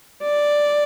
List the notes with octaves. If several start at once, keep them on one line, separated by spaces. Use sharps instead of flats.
D5